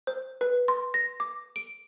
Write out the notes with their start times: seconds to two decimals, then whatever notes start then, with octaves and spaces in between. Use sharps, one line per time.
0.07 C5
0.41 B4
0.68 C6
0.94 A#6
1.20 D6
1.56 D7